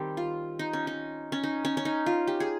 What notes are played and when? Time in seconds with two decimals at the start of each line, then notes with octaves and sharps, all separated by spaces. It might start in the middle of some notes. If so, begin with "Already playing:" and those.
Already playing: D#3 G3 C4 G4
0.17 F4
0.59 D#4
0.73 C#4
0.87 D#4
1.32 C#4
1.44 D#4
1.65 C#4
1.77 C#4
1.85 D#4
2.06 F4
2.27 G4
2.40 G#4